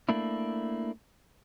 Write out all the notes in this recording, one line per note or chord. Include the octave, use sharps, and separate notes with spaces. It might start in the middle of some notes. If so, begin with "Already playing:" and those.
A3 A#3 D4 E4